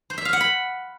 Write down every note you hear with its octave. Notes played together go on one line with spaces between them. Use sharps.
C5
E5
F5
F#5
B5